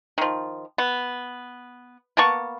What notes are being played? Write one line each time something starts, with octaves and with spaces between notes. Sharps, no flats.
D#3 F3
B3
A#3 B3 A5 C#6